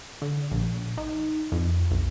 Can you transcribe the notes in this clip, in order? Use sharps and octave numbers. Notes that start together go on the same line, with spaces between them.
D3
A#1
D#4
F2
B1